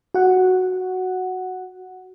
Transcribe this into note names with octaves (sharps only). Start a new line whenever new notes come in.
F#4 F#5